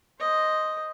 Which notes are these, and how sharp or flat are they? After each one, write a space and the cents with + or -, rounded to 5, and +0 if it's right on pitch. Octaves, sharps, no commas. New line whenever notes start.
C5 +0 D#5 +0